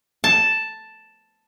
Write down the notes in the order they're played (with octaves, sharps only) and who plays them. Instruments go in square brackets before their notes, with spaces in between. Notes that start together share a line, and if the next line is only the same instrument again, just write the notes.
[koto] A5